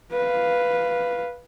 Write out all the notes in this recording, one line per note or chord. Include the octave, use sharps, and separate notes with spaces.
B4 F5